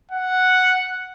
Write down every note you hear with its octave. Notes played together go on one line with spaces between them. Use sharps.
F#5